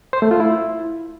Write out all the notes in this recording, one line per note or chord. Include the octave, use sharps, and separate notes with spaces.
C5
A3
F4
E4